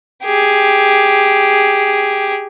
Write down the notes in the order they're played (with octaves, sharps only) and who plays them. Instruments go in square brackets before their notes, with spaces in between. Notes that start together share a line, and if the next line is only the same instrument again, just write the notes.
[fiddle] G4 G#4